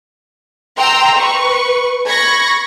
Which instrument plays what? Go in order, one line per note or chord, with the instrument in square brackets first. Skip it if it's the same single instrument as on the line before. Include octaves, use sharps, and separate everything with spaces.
[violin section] G5 A#5 C6 E6
B4 C#6
B5 C#6 G#6 A#6